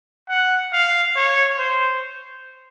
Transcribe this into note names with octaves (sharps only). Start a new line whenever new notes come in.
F#5
F5
C#5
C5